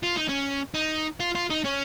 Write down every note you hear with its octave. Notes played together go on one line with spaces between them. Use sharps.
F4
D#4
C#4
D#4
F4
F4
D#4
C#4